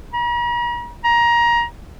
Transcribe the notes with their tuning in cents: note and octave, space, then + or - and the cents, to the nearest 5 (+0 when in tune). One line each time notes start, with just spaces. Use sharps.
A#5 +45
A#5 +20